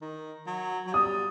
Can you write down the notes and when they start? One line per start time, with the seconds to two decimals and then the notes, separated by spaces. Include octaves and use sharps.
0.02 D#3
0.47 F#3
0.87 F#3
0.93 G3 D#6